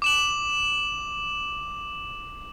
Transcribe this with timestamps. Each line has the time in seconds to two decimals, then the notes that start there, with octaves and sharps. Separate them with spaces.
0.02 D6 E7 F#7